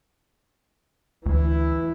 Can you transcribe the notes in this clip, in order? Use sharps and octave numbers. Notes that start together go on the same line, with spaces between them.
D2 E3 E4